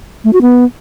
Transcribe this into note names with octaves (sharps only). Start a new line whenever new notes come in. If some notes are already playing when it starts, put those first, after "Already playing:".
A3
F#4
B3